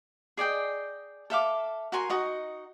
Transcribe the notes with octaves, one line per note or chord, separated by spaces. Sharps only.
G#4 D5 D#5 G5
A4 E5 F5 D6
F#4 A#4 G#5 C6
D#4 F#4 D#5